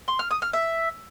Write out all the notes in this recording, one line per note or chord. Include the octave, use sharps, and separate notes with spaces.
C6
F6
D#6
F6
E5